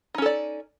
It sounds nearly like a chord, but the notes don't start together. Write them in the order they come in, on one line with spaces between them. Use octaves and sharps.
D#4 C#4 A4 D5